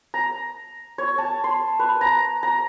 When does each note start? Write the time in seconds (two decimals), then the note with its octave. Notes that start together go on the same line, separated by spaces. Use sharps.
0.14 A#5
0.98 C#5
1.18 A5
1.44 C6
1.80 B4
2.01 A#5
2.43 A#5